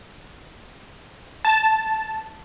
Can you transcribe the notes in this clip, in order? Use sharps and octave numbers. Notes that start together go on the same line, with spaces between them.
A5